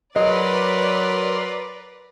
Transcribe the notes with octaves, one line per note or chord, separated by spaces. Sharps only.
F#3 A#4 B4 D5 D#5 C6